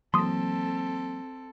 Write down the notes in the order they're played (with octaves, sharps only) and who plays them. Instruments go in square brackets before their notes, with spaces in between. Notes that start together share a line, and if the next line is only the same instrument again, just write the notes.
[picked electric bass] E3 F#3 A#3 [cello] C4 A4 [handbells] C6 D#6